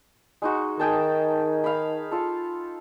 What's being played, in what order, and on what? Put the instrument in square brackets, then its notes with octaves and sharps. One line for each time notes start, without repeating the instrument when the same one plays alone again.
[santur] G#3 D#4 F#4
[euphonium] D#3 [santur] G#4 G5 A5
[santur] F5 B5
F4 A4